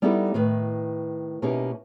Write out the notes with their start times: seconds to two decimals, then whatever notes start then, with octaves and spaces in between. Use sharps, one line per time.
0.02 G3 B3 D#4 E4 G4 A4
0.34 A2 D#3 B4
1.42 B2 A#3 C#4 D#4 E4 G4